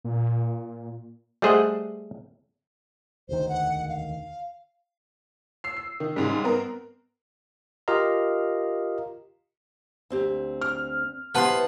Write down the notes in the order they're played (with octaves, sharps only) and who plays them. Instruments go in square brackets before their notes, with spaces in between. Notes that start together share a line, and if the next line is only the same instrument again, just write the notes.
[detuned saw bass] A#2
[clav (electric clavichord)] G3 A3 G#4 C5 D#5 F#5
[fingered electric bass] E1 D2 D#3 [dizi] C5
[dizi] F#5
F5
[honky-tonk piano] E6 C7
C7
D#3
G#2 C#3 G3
B3 C4 A#4
[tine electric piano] F4 G4 A#4 D#5 F5 A#5
[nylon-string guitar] D2 C4 G4
[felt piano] F6
[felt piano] B3 F#5 A5 [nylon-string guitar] E4 G4 C5 [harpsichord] B4 C6